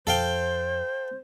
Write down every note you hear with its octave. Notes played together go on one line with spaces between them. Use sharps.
F2 A4 C5 F5 G5